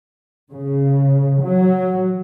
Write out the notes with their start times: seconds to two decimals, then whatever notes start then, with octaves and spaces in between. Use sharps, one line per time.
0.52 C#3
1.43 F#3